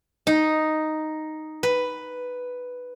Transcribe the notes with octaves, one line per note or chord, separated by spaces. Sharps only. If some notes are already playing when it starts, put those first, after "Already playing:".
D#4
B4